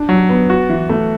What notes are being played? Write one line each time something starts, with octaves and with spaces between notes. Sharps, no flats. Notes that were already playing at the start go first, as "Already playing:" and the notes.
Already playing: D4
F#3
B3
F#4
E3
A3